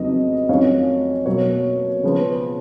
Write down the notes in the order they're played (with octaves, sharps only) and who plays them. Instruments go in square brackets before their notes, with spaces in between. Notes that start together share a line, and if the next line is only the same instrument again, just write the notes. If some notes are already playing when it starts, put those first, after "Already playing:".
Already playing: [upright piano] F2 C#3 F#3 B3 D#4 D#5
F2 D#3 F#3 C#4 C#5 F5
B2 F#3 A#3 C#5
C#3 F3 B3